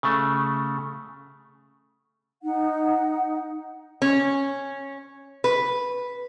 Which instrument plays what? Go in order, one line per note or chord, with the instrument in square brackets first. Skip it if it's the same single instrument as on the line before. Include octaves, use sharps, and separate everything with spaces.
[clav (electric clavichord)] C#3 A3
[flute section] D#4 F#5
[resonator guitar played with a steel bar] C#4
B4